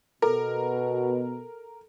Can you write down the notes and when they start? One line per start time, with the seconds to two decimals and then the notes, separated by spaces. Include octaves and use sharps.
0.22 B2 A4 A#4